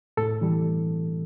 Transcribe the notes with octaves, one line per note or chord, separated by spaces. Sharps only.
A2 A4
E3 G3